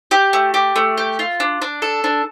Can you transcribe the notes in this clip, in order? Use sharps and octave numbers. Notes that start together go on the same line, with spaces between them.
G4
A3
G4
A3
G4
F4
D4
D4
A4
D4